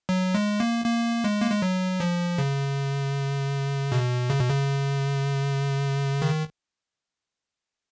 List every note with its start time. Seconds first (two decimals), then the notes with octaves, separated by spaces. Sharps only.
0.09 F#3
0.34 G#3
0.60 A#3
0.86 A#3
1.24 G#3
1.41 A#3
1.51 G#3
1.62 F#3
2.00 F3
2.38 C#3
3.92 B2
4.30 C#3
4.40 B2
4.50 C#3
6.22 D#3